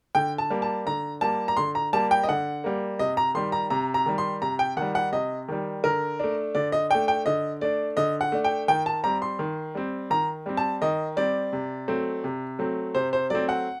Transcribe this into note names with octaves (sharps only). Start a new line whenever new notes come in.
D3 G5
A5
G3 A#3
A5
D3 A#5
G3 A#3 A5
A#5
D3 C6
A#5
G3 A#3 A5
G5
D#5
D3 F#5
G3 A#3
C3 D#5
A#5
D#3 G3 C6
A#5
C3 A#5
A#5
D#3 G3
C6
C3 A#5
G5
D#3 G3 F#5
F#5
C3 D#5
D#3 G3
D3 A#4
A3 D4
D3 D5
D#5
A3 D4 G5
G5
D3 D#5
A3 D4 D5
D3 D#5
F#5
A3 D4
G5
D#3 G5
A5
G3 C4 A#5
C6
D#3
G3 C4
D#3 A#5
G3 C4
A5
D#3 D#5
G3 C4 D5
C3
F#3 A3 C4
C3
F#3 A3 C4
C3 C5
C5
F#3 A3 C4 D5
F#5